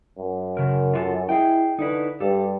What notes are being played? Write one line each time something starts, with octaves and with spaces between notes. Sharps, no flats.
F#2
C#3 A#4
F4 F#4 A4
E4 G#4 D#5 G5
D3 D#4 E4 B4
G2 G4 A4